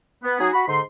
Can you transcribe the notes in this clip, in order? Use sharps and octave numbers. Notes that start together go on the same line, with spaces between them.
B3
F#3 D#4 F#4 G#4
F#4 B5
G#2 D3 D#4 C6